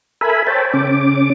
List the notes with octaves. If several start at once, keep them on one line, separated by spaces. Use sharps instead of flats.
A4 A#4 E5 G#5 B5
C5 C#5 G5 A5
C#3 C#4 D6